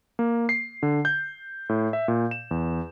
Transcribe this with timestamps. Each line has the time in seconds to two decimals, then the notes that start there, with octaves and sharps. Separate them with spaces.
0.19 A#3
0.49 C7
0.83 D3
1.05 G6
1.69 A2
1.93 E5
2.08 A#2
2.31 E7
2.51 E2